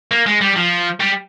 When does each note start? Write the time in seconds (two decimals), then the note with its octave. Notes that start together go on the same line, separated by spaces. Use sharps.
0.11 A#3
0.26 G#3
0.41 G3
0.56 F3
1.00 G3